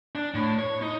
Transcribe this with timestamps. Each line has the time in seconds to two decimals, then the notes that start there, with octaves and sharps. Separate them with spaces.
0.15 D4
0.34 A2
0.59 C#5
0.82 D#4